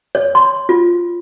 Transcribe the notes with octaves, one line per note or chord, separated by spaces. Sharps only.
C#5
C6
F4